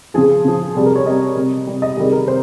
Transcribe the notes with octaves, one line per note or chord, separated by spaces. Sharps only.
C#3 F3 G#4
C#3 F3
C3 G3 G#4
A#4
C#5
C3 G3 D#5
C3 G3
C3 G3
D#5
C3 D#3 G3 G#4
A#4
C3 C5